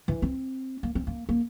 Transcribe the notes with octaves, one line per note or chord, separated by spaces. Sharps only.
E3
C4
A#3
C4
A#3
A#3